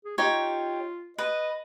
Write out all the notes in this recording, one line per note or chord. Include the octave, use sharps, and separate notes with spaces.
G#4
D#4 F4 G4 C#5
B4 D#5